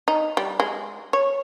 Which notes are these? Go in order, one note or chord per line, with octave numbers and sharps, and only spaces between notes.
D#4
G3
G#3
C#5